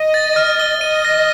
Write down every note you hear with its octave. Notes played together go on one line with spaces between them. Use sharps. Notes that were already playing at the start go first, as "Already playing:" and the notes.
Already playing: D#5
A6
F6
G7
D#5 D#7
A#6